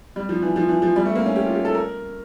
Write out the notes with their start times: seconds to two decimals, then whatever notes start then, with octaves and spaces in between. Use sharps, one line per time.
0.16 G3
0.29 F3
0.42 E3
0.56 F3
0.69 E3
0.82 F3
0.96 G3
1.05 A3
1.15 A#3
1.26 C#4
1.36 G4
1.46 F4
1.55 G4
1.65 A4
1.75 A#4